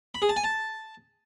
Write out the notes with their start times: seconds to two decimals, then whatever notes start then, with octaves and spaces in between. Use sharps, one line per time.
0.15 B5
0.22 G#4
0.29 A5
0.36 G#5
0.44 A5